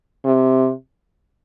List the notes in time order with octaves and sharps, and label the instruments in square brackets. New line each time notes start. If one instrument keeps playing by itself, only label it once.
[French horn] C3